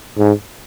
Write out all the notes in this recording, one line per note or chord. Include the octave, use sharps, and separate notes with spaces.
G#2